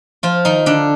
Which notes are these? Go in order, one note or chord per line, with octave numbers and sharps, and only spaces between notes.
F3 F4
D#3 D#4
D3 D4